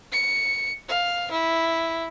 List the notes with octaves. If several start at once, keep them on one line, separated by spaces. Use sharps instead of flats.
C#7
F5
E4